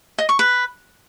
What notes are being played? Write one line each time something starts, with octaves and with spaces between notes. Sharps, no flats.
D#5
C#6
B4